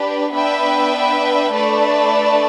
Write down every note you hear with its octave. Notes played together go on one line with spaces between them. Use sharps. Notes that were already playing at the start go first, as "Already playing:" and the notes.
Already playing: D4 G4 B4
B3 D4 B4 E5 G5
A3 D4 B4 D5 A5